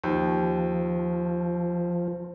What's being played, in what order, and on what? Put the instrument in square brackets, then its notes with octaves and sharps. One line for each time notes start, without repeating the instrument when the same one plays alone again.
[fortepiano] D#2 [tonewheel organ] F3